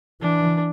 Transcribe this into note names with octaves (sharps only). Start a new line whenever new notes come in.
E3 D4